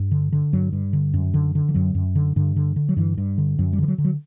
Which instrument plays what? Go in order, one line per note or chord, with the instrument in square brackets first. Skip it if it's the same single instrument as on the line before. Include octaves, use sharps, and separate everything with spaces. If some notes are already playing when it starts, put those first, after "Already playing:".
Already playing: [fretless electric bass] G2
D3
D3
G2 F#3
G2
D3
F#2
D3
D3
E3
F#2 F#3
F#2
D3
G2 D3
D3
D3
F#3
G2 E3
G2
D3
F#2 F#3
G3
D3 E3
F#3
D3
F#3